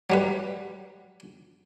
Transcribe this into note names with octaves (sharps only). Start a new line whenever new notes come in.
F#3 G3 B4